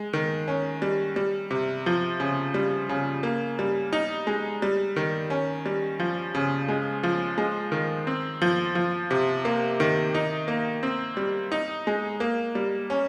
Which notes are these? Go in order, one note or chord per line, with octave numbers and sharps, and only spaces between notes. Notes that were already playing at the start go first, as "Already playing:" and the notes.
Already playing: G#3
D#3
C#4
G3
G3
C3
F3
C#3
G3
C#3
A#3
G3
D#4
G#3
G3
D#3
C#4
G3
F3
C#3
G#3
F3
G#3
D#3
C4
F3
F3
C3
A#3
D#3
D#4
A#3
C4
G3
D#4
G#3
A#3
G3
C#4